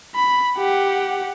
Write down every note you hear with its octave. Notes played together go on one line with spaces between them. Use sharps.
B5
G4 F#5